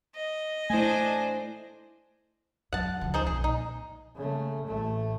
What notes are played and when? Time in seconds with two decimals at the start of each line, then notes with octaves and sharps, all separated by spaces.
0.16 D#5
0.70 A3 D4 E4 C5 G#5
2.73 F#2 F#3 F#5 A5
3.01 C#2 F3
3.14 D#4 G#4 C5
3.27 B1 F2 G#4
3.44 A#2 D#4
4.16 C#3 A3
4.67 A1 A3